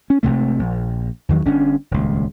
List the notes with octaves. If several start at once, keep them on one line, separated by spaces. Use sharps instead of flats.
C#4
G#1 D#2 C3 A3
A#1
E2 D#3 F#3
G1 C#4 D4
D#1 C#2